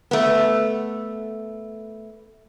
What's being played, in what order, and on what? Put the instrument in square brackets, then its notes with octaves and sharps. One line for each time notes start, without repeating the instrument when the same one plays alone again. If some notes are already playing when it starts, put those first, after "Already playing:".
[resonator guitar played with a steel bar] A3 B3